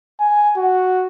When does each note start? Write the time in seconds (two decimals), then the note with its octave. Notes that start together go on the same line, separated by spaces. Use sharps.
0.20 G#5
0.57 F#4